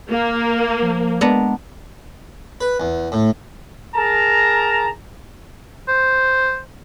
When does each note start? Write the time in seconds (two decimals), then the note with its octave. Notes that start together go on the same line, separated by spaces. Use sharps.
0.10 A#3
0.82 F3
1.21 G#3 B3 D4 A#5
2.61 B4
2.80 E2
3.12 A2
3.95 G#4 A#4 A5 A#5
5.89 C5